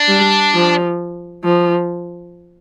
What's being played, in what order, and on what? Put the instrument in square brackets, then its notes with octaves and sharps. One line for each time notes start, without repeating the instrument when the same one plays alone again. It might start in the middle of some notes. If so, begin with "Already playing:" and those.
Already playing: [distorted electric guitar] D4
[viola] G3
F3
F3